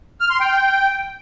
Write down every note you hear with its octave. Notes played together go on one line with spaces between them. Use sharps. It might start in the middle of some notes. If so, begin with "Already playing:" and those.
F6
C6
G5